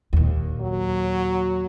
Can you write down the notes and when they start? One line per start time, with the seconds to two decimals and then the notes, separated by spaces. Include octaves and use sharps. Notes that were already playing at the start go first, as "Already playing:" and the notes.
0.13 D#2 A#2
0.61 F#3